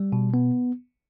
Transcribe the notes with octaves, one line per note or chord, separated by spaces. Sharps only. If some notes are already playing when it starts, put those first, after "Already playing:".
Already playing: G3
B2
B3